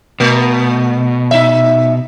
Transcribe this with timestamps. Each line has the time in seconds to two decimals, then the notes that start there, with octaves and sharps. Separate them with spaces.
0.20 B2 A3
1.31 D#4 E5